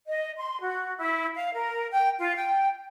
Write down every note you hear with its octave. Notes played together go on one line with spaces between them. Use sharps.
D#5
C6
F#4
E4
F5
A#4
G5
F4
G5